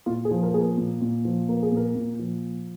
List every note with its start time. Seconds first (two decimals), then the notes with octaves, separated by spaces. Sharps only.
0.06 A#2 F4
0.25 G#4
0.31 F3
0.43 A#4
0.54 A#3 G#4
0.60 A#4
0.77 A#2
1.01 A#2
1.25 F3
1.49 A#3 A#4
1.63 G#4
1.72 A#2 A#4
1.95 A#2
2.19 F3